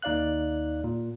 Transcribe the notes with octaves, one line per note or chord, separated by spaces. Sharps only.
D#2 D#4 D5 F5 F#6
A#2